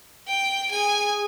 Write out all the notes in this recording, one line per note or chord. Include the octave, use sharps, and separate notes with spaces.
G5
G#4 G#5